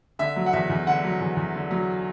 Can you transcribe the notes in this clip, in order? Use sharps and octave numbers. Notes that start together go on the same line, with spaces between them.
D3 E5
F#3
F#5
E2 E5
E2
D3 F#5
F#3
E2
E2
D3
F#3